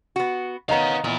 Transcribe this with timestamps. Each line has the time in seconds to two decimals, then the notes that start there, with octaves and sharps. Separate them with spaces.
0.16 B3 F#4
0.69 D#3 B3 C#5 D#5 F5 A#5
1.04 A#2 B3 E4